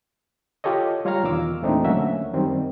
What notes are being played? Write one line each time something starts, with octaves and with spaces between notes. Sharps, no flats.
F4 G4 A4 C#5 D#5
G3 F4 C#5 F5 A#5 F6
E2 B2 D#3 F4 D6 E6
E2 A#2 A3 C4 D4 D#4
D2 F#3 A#3 C#4 F#4 E5
F#2 D#3 G3 C4